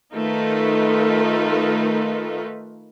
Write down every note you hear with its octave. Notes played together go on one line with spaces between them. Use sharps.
D#3 A3 D#4 F4 B4